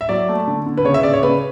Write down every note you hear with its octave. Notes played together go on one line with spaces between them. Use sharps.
E5
F#3 D5
A3
D3
D3
B4
C#3 C#5
E5
C#3 D5
C#5
C#3 B4